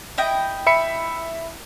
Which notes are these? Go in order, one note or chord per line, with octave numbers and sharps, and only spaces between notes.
E4 D#5 G5
E5 B5 C#7